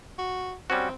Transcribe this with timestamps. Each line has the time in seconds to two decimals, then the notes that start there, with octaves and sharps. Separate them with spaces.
0.18 F#4
0.70 G3 C4 C#4 F#4